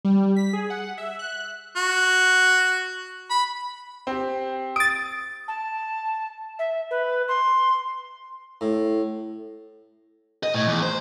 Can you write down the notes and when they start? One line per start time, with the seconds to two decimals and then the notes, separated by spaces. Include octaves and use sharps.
0.05 G3
0.36 B6
0.53 G#4
0.70 F#5
0.98 E5
1.19 F#6
1.77 F#4
3.30 B5
4.07 C4 G4
4.76 D#6 A6 D7
5.48 A5
6.59 E5
6.91 B4
7.28 C6
8.61 A2
10.43 D#5
10.54 A2
10.67 E2
10.82 C5